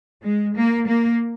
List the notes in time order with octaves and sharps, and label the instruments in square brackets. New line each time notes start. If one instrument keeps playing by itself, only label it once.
[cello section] G#3
A#3
A#3